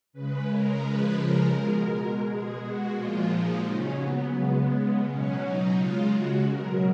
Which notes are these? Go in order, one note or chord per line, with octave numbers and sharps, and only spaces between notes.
C#3 G#3 B4
A#4
C#3 F3 G#3 B4
A#4
B2 G#3
B2 G#3 G#4
F#4
A#2 F3 G#3 F4
D#4
C#3 F#3 C#4
B3
C#3 G#3
B2 F#3 C#4
D#4
C#3 G#3 F4
F#4
B2 F#3 A#4